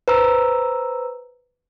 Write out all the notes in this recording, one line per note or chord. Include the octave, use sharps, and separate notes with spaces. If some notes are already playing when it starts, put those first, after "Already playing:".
B4 C5 A#5 E6